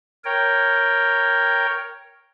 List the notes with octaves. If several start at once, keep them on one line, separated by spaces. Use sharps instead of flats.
A#4 C#5 G5